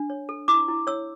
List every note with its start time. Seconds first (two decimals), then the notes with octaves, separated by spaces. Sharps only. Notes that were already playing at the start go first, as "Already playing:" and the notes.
Already playing: D4
0.10 C#5
0.29 A4
0.48 E4 D6
0.68 E4
0.87 C#5 E6